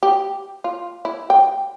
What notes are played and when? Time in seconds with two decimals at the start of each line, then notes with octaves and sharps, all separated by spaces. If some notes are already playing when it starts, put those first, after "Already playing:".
0.03 G4
0.64 F4
1.05 E4
1.30 G5